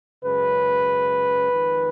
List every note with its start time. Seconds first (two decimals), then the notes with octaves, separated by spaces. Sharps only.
0.24 F#2 C#3 G#3 B4
1.52 F2 D#3 G#3